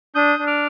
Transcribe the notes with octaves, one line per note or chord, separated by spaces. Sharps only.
D4 D#6 G6
D4
D6 F6